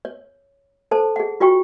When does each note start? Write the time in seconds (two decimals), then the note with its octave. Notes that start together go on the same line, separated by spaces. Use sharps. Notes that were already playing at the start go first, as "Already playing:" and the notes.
0.05 C#5
0.91 A4 C5 A5
1.16 G#4 F#5
1.40 F4 F#4 C#5 G5 C#6